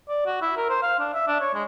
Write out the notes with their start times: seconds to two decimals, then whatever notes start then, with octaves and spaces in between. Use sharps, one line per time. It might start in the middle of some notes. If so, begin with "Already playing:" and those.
0.09 D5
0.26 F#4
0.42 E4
0.57 A#4
0.69 C5
0.82 F5
1.00 D4
1.13 E5
1.27 D4
1.40 C#5
1.54 G#3